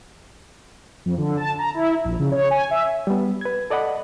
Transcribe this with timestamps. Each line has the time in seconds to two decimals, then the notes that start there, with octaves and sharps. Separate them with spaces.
1.06 F2
1.18 D3
1.37 A5
1.59 A#5
1.74 E4
2.05 A#1
2.19 C#3
2.32 C#5
2.51 G#5
2.71 E5
3.07 G3 B3
3.41 B4 G#6
3.70 A4 D5 D#5 F#5 B5